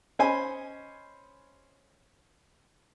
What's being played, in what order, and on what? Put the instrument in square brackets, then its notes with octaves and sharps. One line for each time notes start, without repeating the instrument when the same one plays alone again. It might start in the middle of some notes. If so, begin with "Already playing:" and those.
[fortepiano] C#4 C5 D#5 G#5 B5